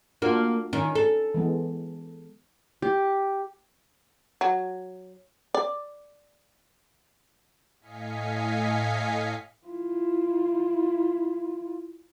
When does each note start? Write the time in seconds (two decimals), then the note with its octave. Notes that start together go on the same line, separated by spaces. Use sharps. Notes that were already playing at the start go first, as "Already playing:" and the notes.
0.22 A#3 D4 F4 F#4
0.73 D#3 C#4 D#4
0.95 A4
1.34 E3 G#3 B3
2.82 G4
4.41 F#3
5.54 D5
7.81 A2 D#5 F5 G#5 B6 C#7
9.67 E4 F4